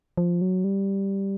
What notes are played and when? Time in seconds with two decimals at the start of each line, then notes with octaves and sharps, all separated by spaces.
0.17 F3
0.41 F#3
0.64 G3